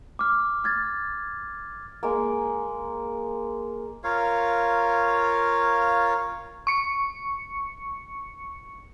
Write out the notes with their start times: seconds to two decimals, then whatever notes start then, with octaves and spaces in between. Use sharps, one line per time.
0.19 D6 F6
0.64 F6 G#6 A6
2.03 G#3 A#3
4.04 F4 A#4 C#5 F5
6.67 C#6 C#7